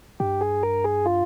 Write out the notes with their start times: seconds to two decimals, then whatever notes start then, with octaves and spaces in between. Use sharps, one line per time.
0.20 G2 G4
0.41 G#4
0.63 A#4
0.84 G#4
1.06 F4